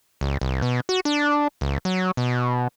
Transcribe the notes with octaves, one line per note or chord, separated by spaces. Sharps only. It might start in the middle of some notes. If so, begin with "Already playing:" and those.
C#2
C2
B2
F#4
D4
C#2
F#3
B2